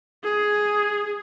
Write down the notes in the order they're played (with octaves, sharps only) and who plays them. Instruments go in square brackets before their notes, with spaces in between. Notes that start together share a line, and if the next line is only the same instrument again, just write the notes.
[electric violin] G#4